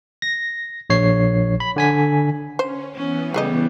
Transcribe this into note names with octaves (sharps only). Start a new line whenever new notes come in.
A#6
A#1 C#5 C7
B5
D3 G#5 B6
C#4 C5
E3 B3 C#4
C#3 G3 A3 G#4 D#5